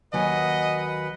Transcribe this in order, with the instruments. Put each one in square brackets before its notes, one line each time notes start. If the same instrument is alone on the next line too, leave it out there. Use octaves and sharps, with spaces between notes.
[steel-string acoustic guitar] D#2 F#3 G#5 [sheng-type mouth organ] B4 F#5 [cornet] D#5